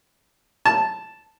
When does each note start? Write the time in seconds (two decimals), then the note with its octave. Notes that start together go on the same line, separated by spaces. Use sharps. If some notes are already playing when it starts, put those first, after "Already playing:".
0.65 A5